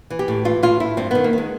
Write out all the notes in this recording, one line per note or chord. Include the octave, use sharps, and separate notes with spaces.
E3
G4
A2
E3 F4
A2 F4
A2 E4
G2 C4
D#3 B3
A#3
D#3 G#3